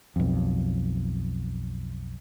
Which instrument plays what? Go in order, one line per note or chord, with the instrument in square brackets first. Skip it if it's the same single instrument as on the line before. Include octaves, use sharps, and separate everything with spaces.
[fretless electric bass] B1 F2